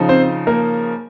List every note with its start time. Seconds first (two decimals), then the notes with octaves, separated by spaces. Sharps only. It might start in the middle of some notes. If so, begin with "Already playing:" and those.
Already playing: C#3 F3 D#4
0.09 C4 C5
0.47 A#3 A#4